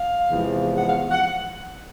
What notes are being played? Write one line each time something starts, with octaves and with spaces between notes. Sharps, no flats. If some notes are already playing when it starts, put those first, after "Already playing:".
Already playing: F5
E2 C3 F3 G#3
F#5
F5
F#5